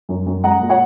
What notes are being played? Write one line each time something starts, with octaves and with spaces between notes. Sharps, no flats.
F#2
F#2
G#3 F#5 A#5
A#2
C#5 F#5